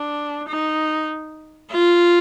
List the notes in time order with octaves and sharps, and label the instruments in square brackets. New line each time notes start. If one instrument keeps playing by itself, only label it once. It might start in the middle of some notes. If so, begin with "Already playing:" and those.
Already playing: [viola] D4
D#4
F4